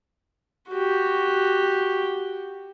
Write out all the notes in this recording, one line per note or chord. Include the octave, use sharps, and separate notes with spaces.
F#4 G4